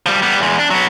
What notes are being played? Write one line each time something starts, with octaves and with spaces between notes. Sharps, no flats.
F3 G3
G3 B3
E2 G#3
D4
F#3 B3